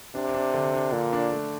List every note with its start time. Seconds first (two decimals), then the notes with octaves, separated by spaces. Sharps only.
0.15 C3 D4
0.34 D4
0.54 D3
0.74 D4
0.93 A#2 D3
1.13 D4
1.32 A3